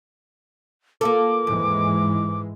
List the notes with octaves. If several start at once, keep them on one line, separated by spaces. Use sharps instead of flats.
A#3 F4 A4 D6
D#2 G#2 E3 G#3